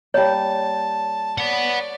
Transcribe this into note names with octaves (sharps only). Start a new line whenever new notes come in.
G3 A#3 C#5 A5
B4 C#5 D5 F#5